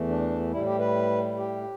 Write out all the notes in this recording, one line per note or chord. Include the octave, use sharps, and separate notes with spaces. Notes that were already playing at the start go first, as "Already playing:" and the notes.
Already playing: E2 E3 A3
D4
A2 G3 E4
G4
B4
G4